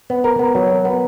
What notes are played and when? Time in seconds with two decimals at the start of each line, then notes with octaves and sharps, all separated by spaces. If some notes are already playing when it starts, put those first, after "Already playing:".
0.10 B3
0.24 A#4
0.39 B3
0.55 F#3
0.70 A#4
0.85 B3